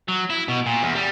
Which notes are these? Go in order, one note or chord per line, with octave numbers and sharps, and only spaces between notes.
F#3
E4
B2
A#2
E2
G3